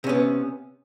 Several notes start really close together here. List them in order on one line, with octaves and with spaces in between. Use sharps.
C3 C#4 B3